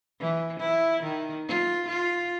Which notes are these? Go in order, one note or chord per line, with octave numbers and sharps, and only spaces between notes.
E3
E4
D#3
F4
F4